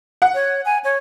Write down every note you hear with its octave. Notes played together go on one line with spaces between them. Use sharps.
F#5
C#5
G#5
C#5